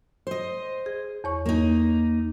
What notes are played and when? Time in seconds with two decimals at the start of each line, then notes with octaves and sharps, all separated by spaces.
0.27 C5 D#5
0.86 G#4
1.24 E2 C#5 C#6
1.46 A#3 D#4